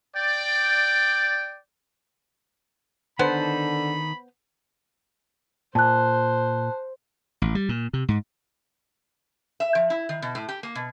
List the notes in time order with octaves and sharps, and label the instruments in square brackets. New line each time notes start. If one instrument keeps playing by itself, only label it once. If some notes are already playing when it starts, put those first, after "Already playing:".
[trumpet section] D5 G5
[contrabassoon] D3 [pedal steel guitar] D#3 D#4 A5 [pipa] B3 C5 [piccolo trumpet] B5
[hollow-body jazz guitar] A#2 [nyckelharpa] C5 [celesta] A5 F#6
[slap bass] A1
G3
A#2
C3
G#2
[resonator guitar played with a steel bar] E5
F3
E4
D#3
B2
A2
G4
A#3
B2